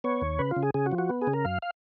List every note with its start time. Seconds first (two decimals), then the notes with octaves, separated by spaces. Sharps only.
0.04 B3 C#5
0.21 D#2
0.39 C#3 B4
0.51 F4
0.56 C#3
0.63 G#4
0.74 C#3 G#4
0.86 F#4
0.92 F3
0.98 F#4
1.09 B3
1.22 G#4
1.27 C#3
1.33 A#4
1.45 F#2 F5
1.62 F5